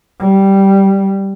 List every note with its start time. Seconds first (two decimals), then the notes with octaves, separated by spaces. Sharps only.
0.20 G3